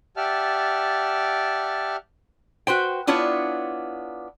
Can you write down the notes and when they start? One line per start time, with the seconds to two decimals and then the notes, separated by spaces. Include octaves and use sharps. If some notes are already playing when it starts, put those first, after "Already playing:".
0.17 G4 D5 E5 F#5 A5 F6
2.67 F#4 B4 C5 G5
3.07 B3 D4 E4 F4 C#5